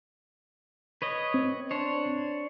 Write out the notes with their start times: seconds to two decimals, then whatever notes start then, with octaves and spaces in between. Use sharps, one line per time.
1.02 B4 C#5 D#5
1.34 C4
1.71 D4 C5 C#5